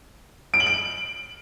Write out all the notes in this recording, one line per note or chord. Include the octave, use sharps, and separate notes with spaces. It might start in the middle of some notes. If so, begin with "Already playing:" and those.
D7
F#7
D7